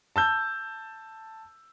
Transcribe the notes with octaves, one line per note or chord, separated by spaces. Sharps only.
A5 E6 G6